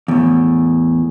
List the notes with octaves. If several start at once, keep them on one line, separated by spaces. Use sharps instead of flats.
E2 A2